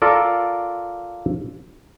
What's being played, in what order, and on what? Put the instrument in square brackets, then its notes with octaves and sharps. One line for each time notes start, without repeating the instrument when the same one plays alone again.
[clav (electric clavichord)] F4 A4 A#4 D5